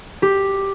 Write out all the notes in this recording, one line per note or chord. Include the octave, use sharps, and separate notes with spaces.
G4